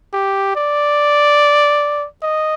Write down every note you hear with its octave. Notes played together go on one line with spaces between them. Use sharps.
G4
D5
D#5